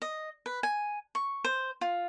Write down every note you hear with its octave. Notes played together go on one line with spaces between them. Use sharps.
D#5
B4
G#5
C#6
C5
F4